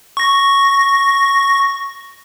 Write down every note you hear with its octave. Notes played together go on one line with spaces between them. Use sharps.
C#6 A#6